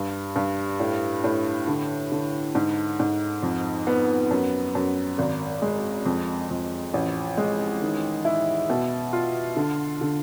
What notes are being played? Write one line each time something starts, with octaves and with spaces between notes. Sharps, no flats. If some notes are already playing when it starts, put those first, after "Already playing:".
Already playing: G2
G2
A2
A2
D3
D3
G#2
G#2
F2
B3
F#2
F#2
G#1
G#3
F2
F2
A1
G#3
D#3
E4
B2
F4
D3
D3